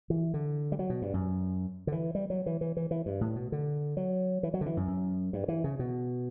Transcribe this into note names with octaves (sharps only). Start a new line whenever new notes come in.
E3
D3
G3
F#3
B2
G2
F#2
D3
E3
G3
F#3
E3
E3
E3
E3
G2
A2
B2
D3
F#3
E3
F#3
D3
E3
F#2
F#2
G2
E3
C#3
B2